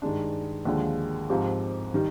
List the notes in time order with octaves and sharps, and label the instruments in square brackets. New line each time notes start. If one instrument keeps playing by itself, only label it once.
[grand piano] G2 D#3 G#3 D4
D#2 D3 F3 G#3
G#2 F3 C4 G4
D#3 G3